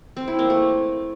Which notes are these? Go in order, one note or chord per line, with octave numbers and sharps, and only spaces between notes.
C4
E4
A#3
A3